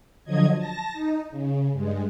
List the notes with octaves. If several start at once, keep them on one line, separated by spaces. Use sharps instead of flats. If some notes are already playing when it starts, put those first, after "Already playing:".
D3 F3 F#3 D#5 G#6
A5 A#6
D#4
C#3
G2 G#3